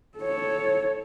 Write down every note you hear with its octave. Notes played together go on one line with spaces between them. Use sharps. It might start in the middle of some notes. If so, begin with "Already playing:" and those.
A4 C#5